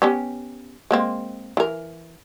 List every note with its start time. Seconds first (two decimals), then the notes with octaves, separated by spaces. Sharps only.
0.02 B3 C#4 G4
0.91 G#3 A#3 C4
1.57 E3 A#4